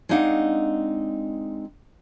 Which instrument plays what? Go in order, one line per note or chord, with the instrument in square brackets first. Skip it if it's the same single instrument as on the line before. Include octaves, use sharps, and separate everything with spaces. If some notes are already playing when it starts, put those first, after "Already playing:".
[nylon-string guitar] G#3 C4 D4 D#4 F5 F#5